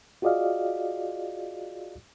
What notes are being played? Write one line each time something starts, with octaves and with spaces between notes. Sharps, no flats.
F4 F#4 G#4 D5 D#5 F5